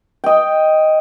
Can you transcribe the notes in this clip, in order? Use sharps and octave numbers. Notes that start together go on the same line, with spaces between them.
D#5 G5